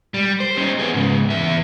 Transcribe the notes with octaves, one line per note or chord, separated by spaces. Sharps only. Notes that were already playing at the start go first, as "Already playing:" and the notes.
G3
C5
C#4 D#4
B3 G#4
G#2 C#3
E2 E5